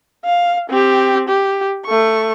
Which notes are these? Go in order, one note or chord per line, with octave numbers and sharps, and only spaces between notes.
F5
C4 G4
G4
A3 C#6